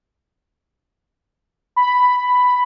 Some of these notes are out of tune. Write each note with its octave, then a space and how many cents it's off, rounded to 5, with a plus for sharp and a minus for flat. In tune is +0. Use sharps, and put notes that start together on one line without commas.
B5 +5